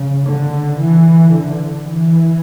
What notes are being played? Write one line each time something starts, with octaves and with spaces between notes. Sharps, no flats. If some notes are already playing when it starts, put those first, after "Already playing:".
Already playing: C#3
D3
E3
D3
E3